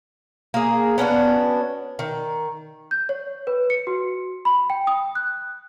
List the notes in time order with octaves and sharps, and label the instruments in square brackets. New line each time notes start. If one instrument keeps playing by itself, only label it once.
[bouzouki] A#3 G#4
B3 C#4 D4 F#4
D#3
[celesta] G6
C#5
B4
C#7
F#4
B5
G5
D#6
F#6